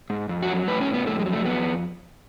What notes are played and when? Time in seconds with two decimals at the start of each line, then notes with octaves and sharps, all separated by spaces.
0.10 G#2
0.29 F2
0.42 F#4
0.49 F#3
0.68 A2 B4
0.81 C#4
0.87 A2
0.94 B3
1.07 F2 A3
1.19 G#3
1.26 F#3
1.33 A3
1.45 F2 B3